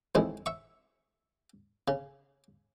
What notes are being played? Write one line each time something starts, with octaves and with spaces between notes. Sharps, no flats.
A1 F2 D#3 G#3 E4
E5 C#6
C#3